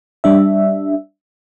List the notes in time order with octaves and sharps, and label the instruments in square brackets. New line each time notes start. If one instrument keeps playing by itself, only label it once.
[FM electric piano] G3 D4 E5